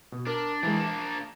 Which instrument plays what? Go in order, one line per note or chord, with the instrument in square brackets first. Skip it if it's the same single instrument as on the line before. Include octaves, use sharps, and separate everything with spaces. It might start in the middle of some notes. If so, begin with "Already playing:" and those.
[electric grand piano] B2
[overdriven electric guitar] D4 [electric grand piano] A#4
[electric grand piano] E3 G#3 [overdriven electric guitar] A#3 D4
[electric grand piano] E7